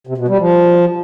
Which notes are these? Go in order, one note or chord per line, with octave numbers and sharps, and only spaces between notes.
C3
B2
G3
F3